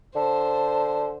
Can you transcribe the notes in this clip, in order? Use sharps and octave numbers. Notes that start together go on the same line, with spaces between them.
D3 C5 A5